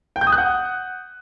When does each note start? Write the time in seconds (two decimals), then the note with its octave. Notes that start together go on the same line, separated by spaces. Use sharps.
0.16 G5
0.21 G6
0.27 D#6
0.32 F#6
0.38 F#5